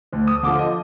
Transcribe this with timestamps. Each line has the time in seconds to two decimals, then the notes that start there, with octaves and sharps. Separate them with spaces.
0.12 D2
0.27 D#6
0.43 D3 F3 D6
0.59 D#5